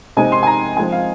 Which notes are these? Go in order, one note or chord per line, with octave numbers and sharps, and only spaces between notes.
C3 G#3 C4 D#4 G#5
C6
G#5
A#5
F3 G#3 C4 D#4 G#5
F5